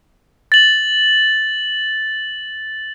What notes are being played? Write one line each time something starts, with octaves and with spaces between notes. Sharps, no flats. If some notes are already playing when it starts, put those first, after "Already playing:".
A6 F#7